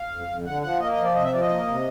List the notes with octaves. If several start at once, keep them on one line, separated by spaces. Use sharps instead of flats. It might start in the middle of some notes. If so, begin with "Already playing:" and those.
Already playing: F5
F2
F2
D3 F#5
F3 F#5
A#3 D#5
D#5
F3
D5
C3 D#5
E5
F3 D5
D#5
A#3
C3